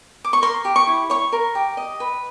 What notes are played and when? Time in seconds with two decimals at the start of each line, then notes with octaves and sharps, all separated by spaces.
0.24 D6
0.33 C#6
0.42 A#4 C6
0.65 G4
0.76 C#6
0.87 E4
1.10 C#5 C#6
1.32 A#4
1.55 G4
1.77 D#5
2.00 B4